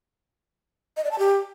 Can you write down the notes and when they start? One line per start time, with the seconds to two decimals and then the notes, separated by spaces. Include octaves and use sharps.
0.97 D#5
1.04 D5
1.11 A5
1.19 G4